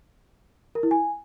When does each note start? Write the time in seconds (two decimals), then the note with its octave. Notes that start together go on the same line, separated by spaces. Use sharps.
0.75 A#4
0.83 E4
0.91 G#5